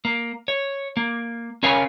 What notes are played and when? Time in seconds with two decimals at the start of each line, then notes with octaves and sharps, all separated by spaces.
0.05 A#3
0.48 C#5
0.97 A#3
1.63 C#4 A#4 C#5 F5 G#5